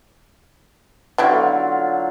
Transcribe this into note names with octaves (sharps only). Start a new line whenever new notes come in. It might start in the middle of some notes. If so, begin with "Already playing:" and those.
D3 F#3 B3 E4 F4 G5